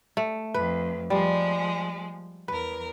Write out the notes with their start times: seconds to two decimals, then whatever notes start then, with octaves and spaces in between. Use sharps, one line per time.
0.17 A3
0.54 F2 B4
1.10 F3 G3 G#3
2.48 E2 A#4 B4